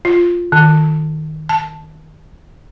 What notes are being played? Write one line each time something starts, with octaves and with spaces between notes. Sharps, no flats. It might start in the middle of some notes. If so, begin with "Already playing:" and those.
F4
D#3
A5